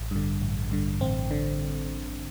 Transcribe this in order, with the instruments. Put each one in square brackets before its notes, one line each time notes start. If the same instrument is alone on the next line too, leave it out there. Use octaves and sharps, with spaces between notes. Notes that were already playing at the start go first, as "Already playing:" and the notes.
Already playing: [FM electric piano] A1
G2 D3
A1
G2 D3
A1 C4
D3